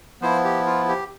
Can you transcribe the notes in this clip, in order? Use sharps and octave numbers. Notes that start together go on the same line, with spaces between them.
F3 B3 E4 C5
G4
F4
G4